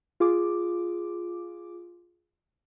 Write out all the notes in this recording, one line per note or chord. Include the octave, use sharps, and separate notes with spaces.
F4 G#4 D6